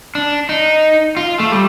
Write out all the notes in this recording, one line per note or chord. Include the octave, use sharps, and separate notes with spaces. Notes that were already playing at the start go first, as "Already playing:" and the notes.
D4
D#4
F4
A3
G3